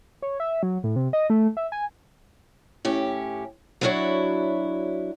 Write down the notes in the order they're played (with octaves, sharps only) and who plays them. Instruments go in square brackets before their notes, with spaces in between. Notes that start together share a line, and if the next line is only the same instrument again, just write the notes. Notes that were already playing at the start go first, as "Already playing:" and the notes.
[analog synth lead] C#5
E5
F#3
A2
C3
D#5
A3
E5
G#5
[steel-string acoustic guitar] A2 C#4 G4
F#3 B3 D4 E4 F#4 C#5